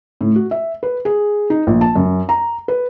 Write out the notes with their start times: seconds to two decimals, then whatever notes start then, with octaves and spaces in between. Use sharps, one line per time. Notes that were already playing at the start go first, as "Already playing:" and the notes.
0.21 A2
0.36 F#4
0.51 E5
0.83 B4
1.05 G#4
1.50 D#4
1.67 A#1
1.81 A5
1.96 F#2
2.29 A#5
2.68 B4